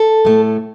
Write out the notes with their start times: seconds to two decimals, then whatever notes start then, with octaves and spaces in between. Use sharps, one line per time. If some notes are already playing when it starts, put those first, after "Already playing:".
Already playing: A4
0.25 A2 A3